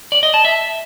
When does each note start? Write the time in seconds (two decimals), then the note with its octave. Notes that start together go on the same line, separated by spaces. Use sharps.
0.12 D5
0.23 D#5
0.34 A5
0.45 E5